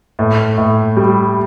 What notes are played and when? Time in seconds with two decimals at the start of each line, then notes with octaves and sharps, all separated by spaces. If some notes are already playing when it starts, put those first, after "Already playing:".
0.19 A2
0.58 A2
0.97 G3